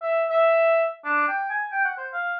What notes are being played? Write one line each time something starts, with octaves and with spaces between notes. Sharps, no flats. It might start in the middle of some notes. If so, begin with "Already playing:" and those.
E5
E5
D4
G5
G#5
G5
F#5
C5
F5